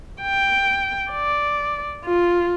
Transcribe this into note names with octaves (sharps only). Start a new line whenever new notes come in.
G5
D5
F4